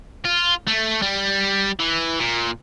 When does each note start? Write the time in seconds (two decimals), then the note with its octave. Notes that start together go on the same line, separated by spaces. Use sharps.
0.25 F4
0.67 A3
1.02 G3
1.79 E3
2.20 A#2